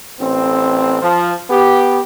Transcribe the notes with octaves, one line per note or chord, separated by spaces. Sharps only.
A1 C4
F3
B3 G4